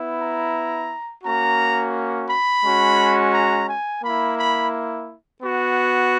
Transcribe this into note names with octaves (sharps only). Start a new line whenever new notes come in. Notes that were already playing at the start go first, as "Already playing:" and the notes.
Already playing: B3 E4
A#5
A#3 C#4 F#4 A#5
B5
G#3 C#4 F#4
A#5
G#5
A#3 E4 B5
B5
B3 F#4